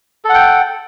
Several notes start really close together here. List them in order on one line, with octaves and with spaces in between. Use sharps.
A4 F#5 G5